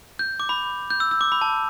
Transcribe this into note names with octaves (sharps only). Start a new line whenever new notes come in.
G6
D6
B5
G6
E6
E6
D6
B5
A5